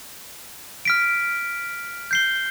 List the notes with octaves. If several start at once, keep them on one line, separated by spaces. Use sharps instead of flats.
F6 B6 D7
G6 C7 G7